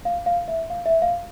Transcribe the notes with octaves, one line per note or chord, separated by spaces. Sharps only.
F5
F5
E5
F5
E5
F5